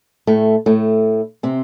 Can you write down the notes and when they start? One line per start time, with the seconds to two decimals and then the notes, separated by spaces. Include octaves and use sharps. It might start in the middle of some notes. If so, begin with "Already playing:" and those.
0.27 A2 A3
0.66 A2 A3
1.43 C3 C4